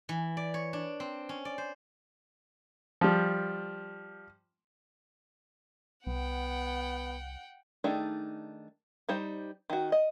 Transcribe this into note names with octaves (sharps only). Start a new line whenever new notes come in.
E3
D5
C#5
D4
C4
C#4
D5
C5
F3 G3
C2 B3 F#5 G5
D#3 A3 D4 D#4 G#4
G3 D#4 C5
D#3 F#4
D#5